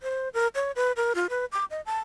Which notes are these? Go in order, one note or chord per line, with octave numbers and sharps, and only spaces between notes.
C5
A#4
C#5
B4
A#4
F4
B4
D6
D#5
A5